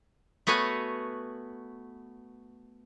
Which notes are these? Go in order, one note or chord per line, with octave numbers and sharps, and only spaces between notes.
A3 B3 F#4 C#5 G#5